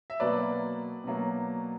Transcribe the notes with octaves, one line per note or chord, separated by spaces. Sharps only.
E5
B2 F#3 A#3 B4 D5
B2 F#3 A#3